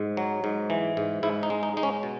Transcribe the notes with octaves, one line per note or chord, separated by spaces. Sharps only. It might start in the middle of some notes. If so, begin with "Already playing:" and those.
Already playing: G#2
F#3
G#2
E3
G#2
G#2 E4
D#4
G#3
D#4
G#3 D#4
C#4
B2